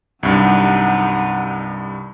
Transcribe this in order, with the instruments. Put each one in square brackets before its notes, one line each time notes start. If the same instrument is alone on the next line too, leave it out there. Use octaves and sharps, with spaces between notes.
[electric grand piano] C2 G2 [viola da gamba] F#3 D#4 [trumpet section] F#5